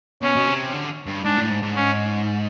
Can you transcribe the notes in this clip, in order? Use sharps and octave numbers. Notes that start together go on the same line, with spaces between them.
B2 C#4
B2
C3
D3
G2
G#2 D4
A2
G#2
G#2
C#4